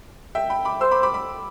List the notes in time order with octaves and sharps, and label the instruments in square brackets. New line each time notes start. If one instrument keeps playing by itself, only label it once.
[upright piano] E5 G5
G5 B5
B5 D6
[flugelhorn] C5 [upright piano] C6 E6
[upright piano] B5 D6
B5 D6
B5 D6